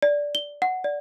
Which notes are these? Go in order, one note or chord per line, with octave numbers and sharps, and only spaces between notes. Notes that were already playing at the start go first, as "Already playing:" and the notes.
D5
G7
F#5
D5